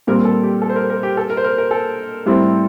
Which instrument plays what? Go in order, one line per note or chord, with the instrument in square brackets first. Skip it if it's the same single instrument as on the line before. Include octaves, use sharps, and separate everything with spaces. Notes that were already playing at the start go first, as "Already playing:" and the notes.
[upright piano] A#2 G3 C4 [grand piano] A#4
[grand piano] A4
G4
A4
C5
A#4
A#4
G4
A4
A#4
C5
A#4
A#4
A4
[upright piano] A2 G3 C4 E4